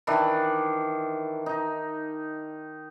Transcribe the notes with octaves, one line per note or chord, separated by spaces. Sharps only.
D#3 E3 D4
D#4